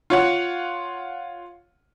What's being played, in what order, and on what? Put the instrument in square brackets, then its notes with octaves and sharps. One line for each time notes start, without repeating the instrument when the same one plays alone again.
[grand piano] F4 C#5 F#5